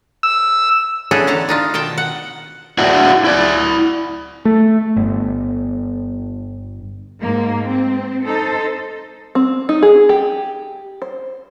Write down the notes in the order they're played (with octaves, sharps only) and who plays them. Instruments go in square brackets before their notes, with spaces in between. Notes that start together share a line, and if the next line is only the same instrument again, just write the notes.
[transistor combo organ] E6
[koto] E3 B3 C#4 D4 G#4 A4
D3 A5 A#5
D4 D#4 F4
B2 D#3 G5 A5
F#5
[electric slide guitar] D4 E4 F#4 D5 E5
E4 D5
[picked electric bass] A3
G1
[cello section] G#2 A#3
C4
D#4 A4 C5
[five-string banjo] C4
D#4
G#4
G4
C5